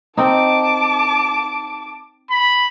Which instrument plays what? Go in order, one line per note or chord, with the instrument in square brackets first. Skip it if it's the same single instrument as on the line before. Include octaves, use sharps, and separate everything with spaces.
[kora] C4 D#4 [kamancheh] A5 D6
[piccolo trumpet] B5